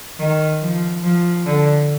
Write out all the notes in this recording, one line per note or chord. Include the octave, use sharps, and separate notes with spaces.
D#3
F3
F3
D3